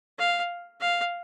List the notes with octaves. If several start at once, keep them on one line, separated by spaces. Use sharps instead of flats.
F5
F5